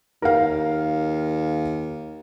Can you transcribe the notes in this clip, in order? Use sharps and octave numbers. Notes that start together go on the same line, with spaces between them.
D#2 A#4 F5